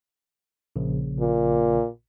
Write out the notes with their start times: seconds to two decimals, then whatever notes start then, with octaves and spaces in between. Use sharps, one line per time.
0.76 A#1 C#3
1.20 A#2